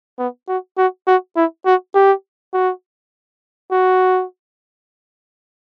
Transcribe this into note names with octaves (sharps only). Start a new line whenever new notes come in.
B3
F#4
F#4
F#4
E4
F#4
G4
F#4
F#4